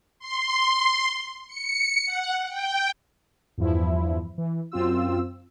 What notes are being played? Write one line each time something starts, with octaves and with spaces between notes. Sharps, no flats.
C6
C#7
F#5
G5
E2 G2 F3 E4
E3
F#2 C4 F4 E6